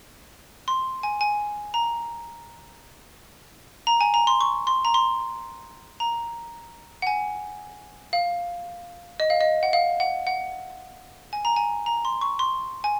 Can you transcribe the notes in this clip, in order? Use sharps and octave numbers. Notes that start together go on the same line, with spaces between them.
C6
G#5
G#5
A#5
A#5
G#5
A#5
C6
C#6
C6
A#5
C6
A#5
F#5
G#5
F5
D#5
F5
D#5
F#5
F5
F#5
F#5
G#5
A#5
G#5
A#5
C6
C#6
C6
G#5